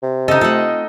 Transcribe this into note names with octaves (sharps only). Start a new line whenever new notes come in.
C3
C#3 D#4 A4 D#5
A3 C4 F4 A4 F#5